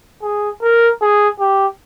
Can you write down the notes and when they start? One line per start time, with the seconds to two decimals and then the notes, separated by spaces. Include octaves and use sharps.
0.22 G#4
0.62 A#4
1.01 G#4
1.40 G4